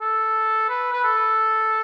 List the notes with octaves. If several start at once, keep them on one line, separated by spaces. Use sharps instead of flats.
A4
B4
B4
A4